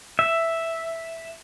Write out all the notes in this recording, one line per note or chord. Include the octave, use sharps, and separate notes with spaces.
E5